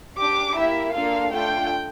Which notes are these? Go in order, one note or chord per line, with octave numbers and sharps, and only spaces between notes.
D4 G4 D6
A#3 E4 G4 E5
A#3 D4 F4 A4 F5
A3 D4 F4 A4 G5